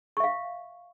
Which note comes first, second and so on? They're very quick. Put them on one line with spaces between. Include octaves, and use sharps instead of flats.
C#6 E5 F5